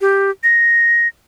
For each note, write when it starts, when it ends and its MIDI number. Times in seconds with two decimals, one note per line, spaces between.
0.01 0.30 67
0.43 1.08 94